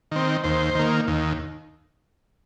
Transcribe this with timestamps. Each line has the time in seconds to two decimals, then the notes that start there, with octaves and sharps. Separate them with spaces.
0.11 D#3 C4
0.44 D#2 C5
0.75 D#3 A#3
1.08 D#2